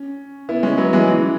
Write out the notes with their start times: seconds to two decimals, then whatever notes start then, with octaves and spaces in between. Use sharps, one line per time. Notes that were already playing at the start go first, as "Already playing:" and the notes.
Already playing: C#4
0.49 B3 E4
0.63 G#3 C#4
0.78 F#3 B3
0.93 E3 G#3
1.08 E3